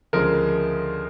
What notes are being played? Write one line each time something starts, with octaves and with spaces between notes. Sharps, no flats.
D2 C#3 F3 G#3 A#4